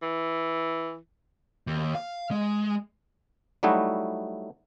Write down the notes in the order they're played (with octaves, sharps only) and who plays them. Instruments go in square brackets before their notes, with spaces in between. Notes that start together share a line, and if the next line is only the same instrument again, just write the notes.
[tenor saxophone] E3
[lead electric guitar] D#2
F5
G#3
[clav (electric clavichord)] F#3 G3 A3 D#4 E4 F#4